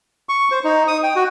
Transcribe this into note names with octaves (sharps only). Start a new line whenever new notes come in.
C#6
C5
D#4
D#6
G5
F#4